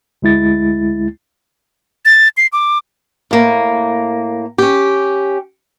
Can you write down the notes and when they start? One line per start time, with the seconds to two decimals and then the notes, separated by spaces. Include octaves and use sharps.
0.22 D2 G#3 E4 A6
2.05 A6
2.37 C7
2.53 D6
3.31 A2 A#3
4.58 C#4 G4